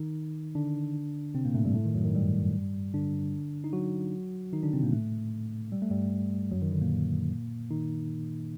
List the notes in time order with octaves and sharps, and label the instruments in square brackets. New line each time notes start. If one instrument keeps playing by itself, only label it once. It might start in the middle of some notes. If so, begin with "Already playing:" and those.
Already playing: [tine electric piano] D#3 D#4
D3 D4
C3 C4
A#2 A#3
A2 A3
G2 G3
A2 A3
D#3
F#2 F#3
D#3
G2 G3
D3 D4
D#4
F#3 F#4
D#3 D#4
D3 D4
C3 C4
A#2 A#3
A2 A3
G3
A3
G2 G3
F#2 F#3
D#3
D3
A#2 A#3
D#3 D#4